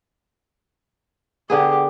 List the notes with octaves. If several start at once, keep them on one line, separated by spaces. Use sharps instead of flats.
D3 B3 G4 G#4